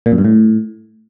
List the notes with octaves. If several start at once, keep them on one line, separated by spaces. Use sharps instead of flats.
A#2
F#2
G2
A2